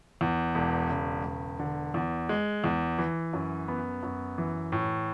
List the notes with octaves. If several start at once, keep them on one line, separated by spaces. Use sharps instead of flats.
E2
E1
C#3
E1
D3
E2
G#3
E2
E3
F#2
B3
F#2
E3
A2